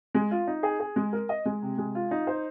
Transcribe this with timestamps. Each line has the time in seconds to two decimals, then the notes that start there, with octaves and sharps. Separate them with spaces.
0.14 G#3
0.31 F4
0.47 D#4
0.63 G#4
0.80 G#4
0.96 G#3
1.13 A#4
1.29 D#5
1.45 G#3
1.62 C3
1.78 G#3
1.95 F4
2.11 D#4
2.27 C5